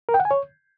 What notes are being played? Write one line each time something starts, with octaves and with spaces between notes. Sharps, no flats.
A#4
G5
F#5
G#5
C#5